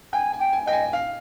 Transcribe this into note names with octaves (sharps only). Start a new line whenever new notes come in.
G5 G#5
G#5
G5
G#5
D#5 G5
G#5
F5